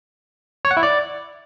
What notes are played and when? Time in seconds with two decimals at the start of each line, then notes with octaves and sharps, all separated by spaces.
0.65 C#5
0.71 F#5
0.77 E4
0.83 D5